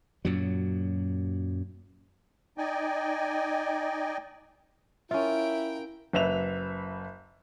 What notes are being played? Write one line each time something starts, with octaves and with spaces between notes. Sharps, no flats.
F#2 A#2 F#3
D#4 D5 D#5 G5 G#5
C#4 E4 F4 A#4 E5 G5
F#1 B4 E5 E7 F7